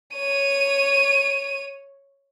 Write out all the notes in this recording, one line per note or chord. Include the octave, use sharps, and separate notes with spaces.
C#5 D#7